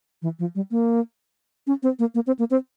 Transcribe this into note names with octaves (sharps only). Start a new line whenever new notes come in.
E3
F3
G3
A#3
C#4
C4
A#3
A#3
C4
A#3
C4